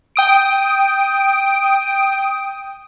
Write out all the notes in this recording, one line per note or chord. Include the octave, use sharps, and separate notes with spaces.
G5 D#6 D7